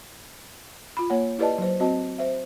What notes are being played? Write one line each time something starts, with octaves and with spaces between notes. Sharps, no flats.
F4 B5
A#3 C#5 F#5
E4 G4 B4 D5 D#5 A5
F#3 C5
C4 F#4 D#5 A5
C5 E5